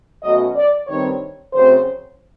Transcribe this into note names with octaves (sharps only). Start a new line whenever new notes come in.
B2 F#3 A3 C#4 D#5
D5
G2 D#3 G3 C4 C#5
C#3 F#3 A3 C4 C5